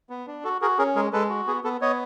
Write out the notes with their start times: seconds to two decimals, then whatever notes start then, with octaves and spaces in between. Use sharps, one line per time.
0.10 B3
0.27 D4
0.44 F#4 A4
0.62 F#4 G#4 A#4
0.78 C#4 G#4 A#4
0.96 G#3 G#4 A#4
1.13 G#3 A4 B4
1.30 F#4
1.47 B3 G#4
1.64 B3 A4
1.81 B3 C#5 D#5